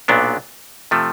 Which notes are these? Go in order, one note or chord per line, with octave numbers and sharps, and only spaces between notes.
B1 A#2 F#3 B3 D4
C3 F3 A3